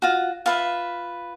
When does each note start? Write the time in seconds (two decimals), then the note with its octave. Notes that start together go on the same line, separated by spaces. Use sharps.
0.02 F4 F#4
0.46 F4 B4 E5